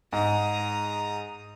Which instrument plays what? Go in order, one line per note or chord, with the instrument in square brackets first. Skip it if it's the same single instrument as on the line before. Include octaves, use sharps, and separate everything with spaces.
[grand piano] G#2 [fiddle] A#5 D#6